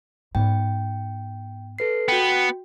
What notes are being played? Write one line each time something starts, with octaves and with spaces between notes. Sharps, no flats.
G#2 B3 G5
A4 B4 C7
B3 F#4 G5